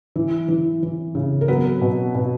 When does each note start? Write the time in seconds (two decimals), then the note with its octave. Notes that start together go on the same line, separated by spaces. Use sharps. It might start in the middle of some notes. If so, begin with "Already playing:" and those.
0.16 E3
0.49 E3
0.83 E3
1.15 C#3
1.41 A#4
1.48 F#3 B3 B4
1.82 B2
2.15 B2